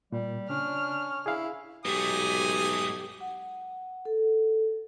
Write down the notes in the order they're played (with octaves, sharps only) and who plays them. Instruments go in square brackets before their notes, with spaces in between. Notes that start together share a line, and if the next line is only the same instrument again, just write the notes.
[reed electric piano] A#2 [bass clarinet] G3
[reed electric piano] C#3 [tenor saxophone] C#4 [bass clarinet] D4 [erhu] F6
[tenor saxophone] E4 [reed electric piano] G#4 F5
[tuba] B1 [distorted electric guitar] G#2 A3 [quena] G4 [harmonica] G#5 D#6
[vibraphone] F#5
A4